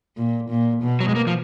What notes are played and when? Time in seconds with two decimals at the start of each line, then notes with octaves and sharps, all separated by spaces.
0.17 A#2
0.50 A#2
0.83 B2
1.01 F#3
1.09 G#3
1.16 A#3
1.27 F3